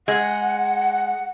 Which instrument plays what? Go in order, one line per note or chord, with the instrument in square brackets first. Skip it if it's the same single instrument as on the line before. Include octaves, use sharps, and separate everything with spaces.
[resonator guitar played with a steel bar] G#3 [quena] F#5